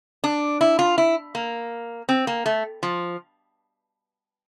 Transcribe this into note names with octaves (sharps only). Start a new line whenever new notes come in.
D4
E4
F4
E4
A#3
C4
A#3
A3
F3